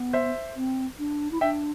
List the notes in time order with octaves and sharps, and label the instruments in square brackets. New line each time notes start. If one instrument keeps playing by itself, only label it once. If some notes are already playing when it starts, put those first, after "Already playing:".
Already playing: [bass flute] B3
[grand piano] C5 E5
[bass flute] C4
D4
E4
[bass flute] D4 [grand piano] E5 G5